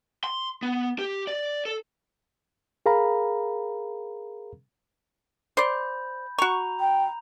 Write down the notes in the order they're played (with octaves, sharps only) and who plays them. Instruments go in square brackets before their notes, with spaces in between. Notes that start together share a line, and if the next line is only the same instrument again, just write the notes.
[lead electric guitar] C6
B3
G4
D5
A4
[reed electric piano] G#4 A#4 F5 A#5 B5
[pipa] C5 D5 [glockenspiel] B5 G6
[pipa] F#4 C#6 [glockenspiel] A#5 F7
[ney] G5